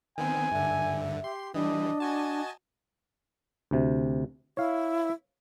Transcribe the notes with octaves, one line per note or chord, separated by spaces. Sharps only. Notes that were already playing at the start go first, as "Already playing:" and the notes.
D#3 B3 C4 G#5
G2 D3 E5
G4 C6
E3 G3 D4 D#5
F#4 D#5 G#5 A5
D2 C3
E4 C#5 F5